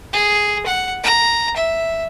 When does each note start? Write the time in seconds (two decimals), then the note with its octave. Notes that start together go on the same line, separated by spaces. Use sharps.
0.13 G#4
0.66 F#5
1.04 A#5
1.56 E5